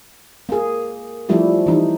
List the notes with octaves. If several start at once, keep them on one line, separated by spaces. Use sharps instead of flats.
A#3 G#4
F3 G3 A3 E4 G4
E3 D#4